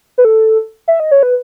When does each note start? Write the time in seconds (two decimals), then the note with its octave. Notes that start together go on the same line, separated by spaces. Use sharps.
0.18 B4
0.25 A4
0.88 E5
1.00 D#5
1.11 C#5
1.23 B4